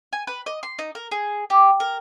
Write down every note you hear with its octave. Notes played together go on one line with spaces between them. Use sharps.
G#5
B4
D#5
C6
D#4
A#4
G#4
G4
A#4